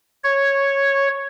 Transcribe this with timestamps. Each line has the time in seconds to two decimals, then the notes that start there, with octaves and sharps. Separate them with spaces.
0.24 C#5